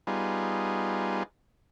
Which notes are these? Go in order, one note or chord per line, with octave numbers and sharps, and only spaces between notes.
G3 B3 D#4 F4 G#4